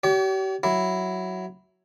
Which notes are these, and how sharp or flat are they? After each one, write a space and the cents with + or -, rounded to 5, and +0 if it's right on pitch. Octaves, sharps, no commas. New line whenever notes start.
G4 -40 C#5 +45
F#3 +5 E4 +0